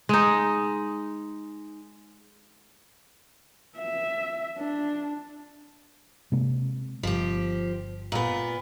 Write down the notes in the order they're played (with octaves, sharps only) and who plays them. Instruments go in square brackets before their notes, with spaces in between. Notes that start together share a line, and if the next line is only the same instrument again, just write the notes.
[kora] G#3 D#4
[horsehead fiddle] E5
D4
[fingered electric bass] C3 G#3 A#3
[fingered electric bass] G1 [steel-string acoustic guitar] F3 G4
[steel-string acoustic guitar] A#2 B3